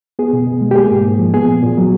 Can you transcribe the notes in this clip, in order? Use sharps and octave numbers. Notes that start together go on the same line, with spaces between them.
B3 G#4
B2
B2
G#3
G4
A#3 G#4
G#2
G#2
F3
B3 G#4
A#2
A#2
F#3